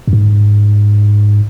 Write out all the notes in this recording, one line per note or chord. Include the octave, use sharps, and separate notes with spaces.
F#2
G#2